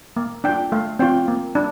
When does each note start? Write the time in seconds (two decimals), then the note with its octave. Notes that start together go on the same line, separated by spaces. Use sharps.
0.16 A#3
0.44 D4 F4 G5
0.72 A3 F5
0.99 C4 F4 G5
1.28 A#3
1.55 D4